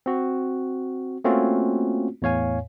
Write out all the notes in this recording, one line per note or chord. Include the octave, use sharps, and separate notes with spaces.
C4 F#4
A3 A#3 C4 C#4 F4 F#4
E2 A2 C#5 F5 G#5